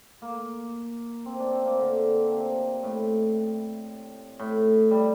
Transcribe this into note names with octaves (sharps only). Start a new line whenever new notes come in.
A#3
C4
D4
C4
A#3
D3
C3
A2
A2
G3